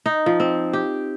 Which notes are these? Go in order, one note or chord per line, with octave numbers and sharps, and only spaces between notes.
D#4
F3
C4
G4